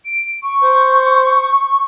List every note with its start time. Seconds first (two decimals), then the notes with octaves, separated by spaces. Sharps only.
0.05 D7
0.43 C#6
0.63 C5